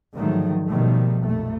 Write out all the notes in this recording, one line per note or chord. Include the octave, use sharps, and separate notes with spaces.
G#2 D3 D#3 F3 F#3 A3
B2 D#3 F3 G3 A3
A#1 F2 A3